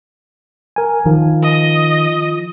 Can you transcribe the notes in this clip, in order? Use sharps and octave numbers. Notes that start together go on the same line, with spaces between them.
A#4 G#5
D#3 F3
D#5